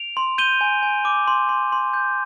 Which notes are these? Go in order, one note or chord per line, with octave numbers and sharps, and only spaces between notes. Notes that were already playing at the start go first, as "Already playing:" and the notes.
Already playing: D7 F7
C6
G6 D#7 G7
G#5
G#5
D6
C6
C6
C6
G6